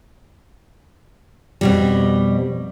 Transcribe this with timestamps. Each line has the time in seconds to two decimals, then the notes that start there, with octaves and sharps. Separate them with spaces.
1.61 F2 B2 G3